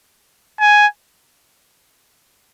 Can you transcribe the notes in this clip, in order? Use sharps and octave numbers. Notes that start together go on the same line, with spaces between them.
G#5